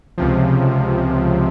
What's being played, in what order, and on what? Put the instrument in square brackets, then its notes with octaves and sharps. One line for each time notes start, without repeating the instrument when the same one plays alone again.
[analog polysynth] C#2 C3 F3